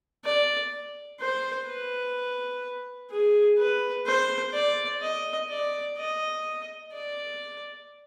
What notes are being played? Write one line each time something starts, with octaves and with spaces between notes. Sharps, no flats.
D5
C5
B4
G#4
B4
C5
D5
D#5
D5
D#5
D5